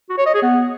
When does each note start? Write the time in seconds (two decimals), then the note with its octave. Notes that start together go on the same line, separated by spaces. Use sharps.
0.10 F#4
0.18 C#5
0.26 D#5
0.34 G#4
0.42 B3